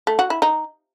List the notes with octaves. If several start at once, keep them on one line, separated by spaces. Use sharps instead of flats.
A3
F#4
E4
D#4